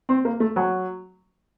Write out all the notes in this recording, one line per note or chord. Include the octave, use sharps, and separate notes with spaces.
C4
A#3
A3
F#3